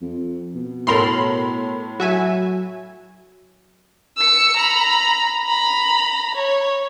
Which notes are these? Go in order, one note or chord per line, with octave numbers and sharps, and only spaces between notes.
F2
B2
A2 A4 A#4 B5 C6 F7
F#3 F#4 E5 G#5
E6 C#7
A#5 B5
A#5 B5
C#5